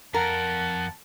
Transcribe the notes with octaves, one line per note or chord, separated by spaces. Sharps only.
F2 A#4 F#5 A5